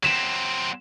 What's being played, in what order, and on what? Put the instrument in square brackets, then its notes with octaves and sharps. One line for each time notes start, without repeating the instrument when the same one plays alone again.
[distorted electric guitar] F#3 C4 [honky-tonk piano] B6 E7